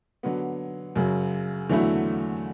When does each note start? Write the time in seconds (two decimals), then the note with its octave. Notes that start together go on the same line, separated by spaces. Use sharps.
0.23 D3 F#3 B3
0.96 F#2 C#3 F#3
1.69 E2 D3 F#3 A3 E4